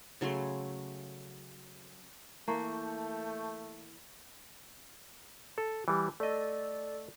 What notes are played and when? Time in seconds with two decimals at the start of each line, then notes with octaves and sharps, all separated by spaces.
0.21 C#3 F#3 A3 C6
2.48 E3 A3 A#3 A5 C#6 G6
5.58 A4
5.88 E3 G3
6.20 A3 A4 D5 D#5